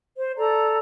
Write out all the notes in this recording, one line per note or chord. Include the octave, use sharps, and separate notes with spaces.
C5
A4 D5 A#5